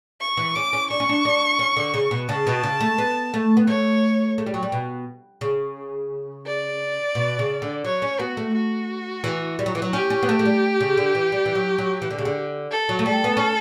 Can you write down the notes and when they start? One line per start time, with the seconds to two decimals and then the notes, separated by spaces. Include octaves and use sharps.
0.21 C#6
0.37 E3
0.55 C#4 D6
0.73 C#4
0.90 D4 C#6
1.00 C#4
1.09 D4
1.25 D4
1.59 C#4
1.77 D3
1.94 C#3
2.11 B2
2.29 C#3 A5
2.47 B2
2.64 C#3
2.81 A3
2.98 B3
3.34 A3
3.57 B3
3.67 A3 C#5
4.38 A3
4.46 G3
4.54 F#3
4.63 G3
4.72 B2
5.41 C#3
6.47 D5
7.15 B2
7.39 C#3
7.62 D3
7.84 F#3 C#5
8.02 C#4
8.19 B3 F#4
8.37 A3
8.54 F#4
9.24 E3
9.59 G3
9.66 F#3
9.75 E3
9.82 F#3
9.93 C#4 G4
10.10 C#4
10.23 B3
10.29 A3
10.39 A3
10.46 G3
10.80 C#3
10.97 D3
11.15 E3
11.32 G3
11.46 E3
11.55 F#3
11.78 F#3
12.02 E3
12.11 D3
12.18 C#3
12.25 D3
12.71 A4
12.89 F#3
12.99 A3
13.06 G3 A4
13.24 B3
13.37 C#4